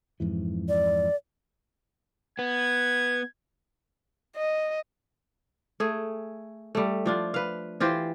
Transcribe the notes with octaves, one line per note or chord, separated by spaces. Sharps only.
F2 G#2 E3
D5
B3 G#6
D#5
A3 G#4
G3 A3
F3 D4 F4
B4 F5
E3 F4 G4 C5